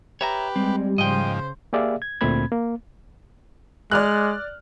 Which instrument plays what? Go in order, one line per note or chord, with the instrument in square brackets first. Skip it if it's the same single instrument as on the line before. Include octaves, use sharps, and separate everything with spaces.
[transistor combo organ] G4 B4 [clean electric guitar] C#5 E5 A#5
[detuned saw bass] G3 [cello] G#3 [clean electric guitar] C4
[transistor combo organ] G#2 F3 [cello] C#3 C5 [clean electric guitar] D#5 G5
[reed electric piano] A#3 G4 G#4 D5 E5 F5
G#6
D2 A#2 A3 C4 B5 G#6
A#3
[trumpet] G#3 [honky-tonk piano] D5 F6 F#6